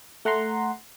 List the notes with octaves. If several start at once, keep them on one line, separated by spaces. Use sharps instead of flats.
A3 F#5 A#5 C6